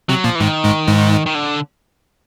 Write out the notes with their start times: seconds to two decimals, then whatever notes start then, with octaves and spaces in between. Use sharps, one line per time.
0.09 C3 F#3 C4
0.24 A#2 F3 A#3
0.35 E3
0.40 G#2 D#3 G#3
0.64 G#2 G#3
0.87 G#2 G#3
1.26 D#3
1.35 D3